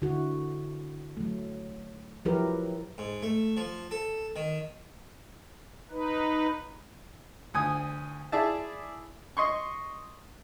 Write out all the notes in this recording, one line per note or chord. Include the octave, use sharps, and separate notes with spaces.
D3 E4 F#4
F#3 A3
F3 F#3 E4 G4 A#4 B4
G#2
A3
F3
A4
D#3
D#4 B4
D2 G#5 D#6
E4 G#4 D5 E5 A5
D#5 C6 C#6